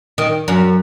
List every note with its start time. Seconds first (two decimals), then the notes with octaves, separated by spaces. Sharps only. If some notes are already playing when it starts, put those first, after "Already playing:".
0.18 D#3
0.48 F#2